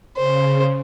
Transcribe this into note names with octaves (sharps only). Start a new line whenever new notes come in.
C#3 C5